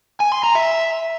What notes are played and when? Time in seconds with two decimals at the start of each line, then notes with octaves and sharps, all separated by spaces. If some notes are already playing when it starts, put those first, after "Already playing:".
0.20 G#5
0.32 C6
0.44 A#5
0.55 E5